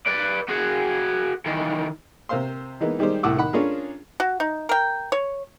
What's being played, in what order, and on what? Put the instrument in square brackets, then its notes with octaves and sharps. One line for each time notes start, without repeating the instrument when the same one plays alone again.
[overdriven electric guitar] B4 D5
F#4 G#4
D#3 E3
[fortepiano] C3 A#4 C5 F5 C6
E3 G#3 A#3 B3 D#4
D#3 G3 G#3 D#4 G4 C5
C2 A2 E4 F#5 D6 E6
D#3 D#4 F#5 B5
C#4 D4 F4 G#4 A#4
[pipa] F#4
D#4
A#4 G5
C#5